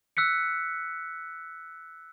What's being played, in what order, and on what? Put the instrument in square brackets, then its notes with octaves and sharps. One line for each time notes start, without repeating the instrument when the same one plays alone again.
[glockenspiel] E6 F#6 B6 C#7